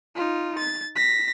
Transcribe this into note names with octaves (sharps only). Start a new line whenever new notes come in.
D#4 F4
A6
A#6 B6